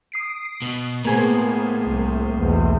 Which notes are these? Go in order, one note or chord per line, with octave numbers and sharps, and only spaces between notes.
D#6 C7 D7
B2
A2 A#3 B3 G#4 C5
C2
B1 E2